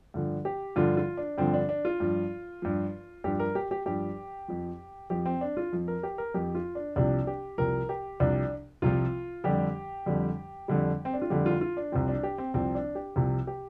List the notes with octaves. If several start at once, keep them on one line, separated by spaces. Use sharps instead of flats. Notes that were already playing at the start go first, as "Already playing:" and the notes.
G2 D3 F3
G4
G2 D3 F3 F4
F4
D4
G2 D3 F3 C4
D4
D4
F4
G2 F3
G2 F3
G2 F3 G4
A#4
G4
G4
G2 F3 G4
F2 F3
F2 F3 G4
C4
D4
F4
F2 F3
A#4
G4
A#4
F2 F3 G4
F4
D4
C2 C3 F3 D4
G4
C2 C3 F3 A#4
G4
C2 C3 F3 D4
C2 C3 F3 F4
F2 D3 G3 G4
F2 D3 G3
F2 D3 G3
C4
D4
F4
F2 D3 G3 G4
F4
F4
D4
C2 C3 F3 C4
D4
G4
C4
C2 C3 F3 C4
D4
G4
C2 C3 F3
G4